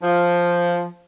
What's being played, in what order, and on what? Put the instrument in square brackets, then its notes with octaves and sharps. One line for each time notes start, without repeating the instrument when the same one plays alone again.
[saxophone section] F3